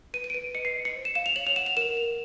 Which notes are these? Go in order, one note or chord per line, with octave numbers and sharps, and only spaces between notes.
B4 D#7
D#7
D7
B4 D#7
D#5 C#7
C7
D#5
C#7
C5
E7
F5 E7
F7
C#5 F#7
F7
F#5 E7
F7
A#4 E7
A#4 F7